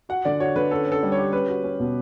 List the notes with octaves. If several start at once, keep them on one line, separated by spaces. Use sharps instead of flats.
F#4 F#5
D3 D5
F#4 C#5
D3 B4
C#4 A4
C#4 A4
G3
C#5
G4
C#4 B4
F#4
C#4
B2